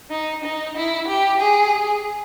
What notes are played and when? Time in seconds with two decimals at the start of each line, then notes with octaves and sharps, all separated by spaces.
0.11 D#4
0.44 D#4
0.76 E4
1.08 G4
1.40 G#4